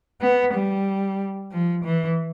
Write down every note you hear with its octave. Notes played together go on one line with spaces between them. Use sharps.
B3
G3
F3
E3